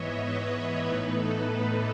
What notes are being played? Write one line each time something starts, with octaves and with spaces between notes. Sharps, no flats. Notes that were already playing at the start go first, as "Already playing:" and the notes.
Already playing: G#2 E3 B3 C#5 D#5 E5
B4
B4
A2 E3 B3 D#4 B4
A4
A4